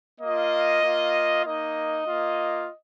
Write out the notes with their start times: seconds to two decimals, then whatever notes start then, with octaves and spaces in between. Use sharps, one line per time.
0.21 A#3 F4 D#5
0.83 A#3 F4
1.45 A#3 D#4 D#5
2.07 A#3 F4